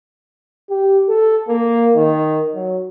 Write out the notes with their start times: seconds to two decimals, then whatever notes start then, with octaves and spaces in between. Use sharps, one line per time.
0.70 G4
1.09 A4
1.48 A#3
1.96 D#3
2.55 F#3